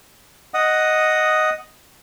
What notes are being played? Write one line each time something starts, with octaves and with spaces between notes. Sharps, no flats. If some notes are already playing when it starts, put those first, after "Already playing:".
D#5 F#5 D#6